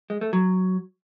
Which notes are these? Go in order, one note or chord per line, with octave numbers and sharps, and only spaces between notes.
G#3
A3
F#3